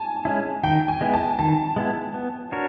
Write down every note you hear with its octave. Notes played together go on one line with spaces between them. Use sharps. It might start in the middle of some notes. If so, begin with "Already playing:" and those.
Already playing: G#5 A5
G#3 C#4 E4
D#3 G5
G#5
G#3 B3 E4
A5
D#3 A5
G#3 B3 E4
B3
D4 F#4 A#4 C#5